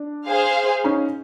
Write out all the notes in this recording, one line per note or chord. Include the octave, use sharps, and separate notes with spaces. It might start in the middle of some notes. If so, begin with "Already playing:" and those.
Already playing: D4
G#4 C5 F5
C#4 D#4